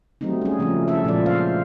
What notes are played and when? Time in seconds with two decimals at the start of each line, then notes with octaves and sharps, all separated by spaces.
0.21 F#3 G3 A3 C4 D#4
0.42 C#4 G#4
0.59 C#3 F3 A3 A#3 C#4 D#4
0.88 E4 A4 E5
1.04 A#2 F3 G#3 A4 D5
1.26 C5 F5